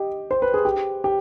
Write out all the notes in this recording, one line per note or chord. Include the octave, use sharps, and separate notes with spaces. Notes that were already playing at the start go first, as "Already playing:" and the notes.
Already playing: G4 D#5
C5
B4
G#4
G4
G4